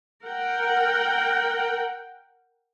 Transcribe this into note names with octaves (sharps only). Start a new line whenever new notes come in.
A#4 F#5 G5